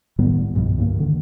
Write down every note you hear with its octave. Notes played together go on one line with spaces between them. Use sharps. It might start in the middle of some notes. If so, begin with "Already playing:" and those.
A2 D#3 G3 B3
C2 G2 B2 F3
D2 G2 G#3 A#3
D3 D#3